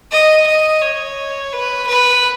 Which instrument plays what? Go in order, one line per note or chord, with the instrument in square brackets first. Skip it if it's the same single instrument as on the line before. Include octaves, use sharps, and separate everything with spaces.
[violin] D#5
D#5
C#5
B4
B4